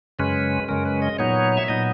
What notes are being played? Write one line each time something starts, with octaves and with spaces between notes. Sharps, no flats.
F#2 C#3 G#3 C#4 B4
F#2 C#3 G#3 C#4 A#4
B4
D#5
A#2 F#3 B3 D#4 C#5
E5
A#2 F#3 B3 D#4 D#5